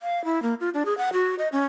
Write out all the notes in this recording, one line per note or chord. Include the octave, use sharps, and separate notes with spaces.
F5
E4
A#3
F4
D4
G#4
F#5
F#4
D#5
C#4